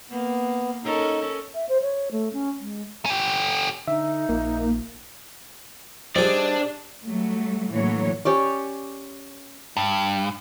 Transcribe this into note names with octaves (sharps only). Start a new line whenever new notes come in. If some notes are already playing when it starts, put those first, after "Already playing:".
A#3 B3
C#4 D#4 A4 A#4
E5
C5
C#5
A3
C#4
G#3
C#4 G4
D3 D#4 E5
A#1 A#3
G3 C4 D4 G#4 D5 D#5
F#3 G3 A3
A2 D3 E3 F#3 A#3 C#5
C#4 G4 C#5 D5
G2